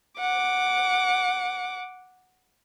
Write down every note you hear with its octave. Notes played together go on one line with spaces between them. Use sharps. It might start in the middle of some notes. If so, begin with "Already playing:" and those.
F#5 D6